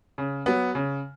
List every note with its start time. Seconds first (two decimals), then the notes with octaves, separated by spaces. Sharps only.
0.18 C#3
0.46 F#3 B3
0.75 C#3